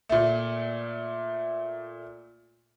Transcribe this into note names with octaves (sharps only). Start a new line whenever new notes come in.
A#2 A3